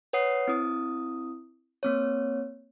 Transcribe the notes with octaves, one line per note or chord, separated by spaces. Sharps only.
B4 C#5 F#5 D#6 C7
C4 E4 D#6
A#3 C4 C#5